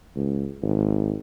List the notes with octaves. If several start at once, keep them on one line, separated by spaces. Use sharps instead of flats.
C#2
G#1